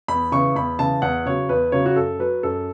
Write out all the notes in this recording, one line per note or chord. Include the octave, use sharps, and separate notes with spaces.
E2 B5
C#3 E3 C#6
E2 B5
C#3 E3 A5
E2 F#5
C#3 F#3 C#5
E2 B4
C#3 F#3 C#5
F#4
F#2 A4
F#3 B4
F#2 A4